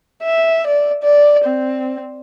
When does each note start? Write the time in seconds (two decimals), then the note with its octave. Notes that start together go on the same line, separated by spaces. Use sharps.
0.23 E5
0.67 D5
1.03 D5
1.45 C4